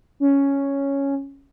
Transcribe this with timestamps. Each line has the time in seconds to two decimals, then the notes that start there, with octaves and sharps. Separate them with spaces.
0.20 C#4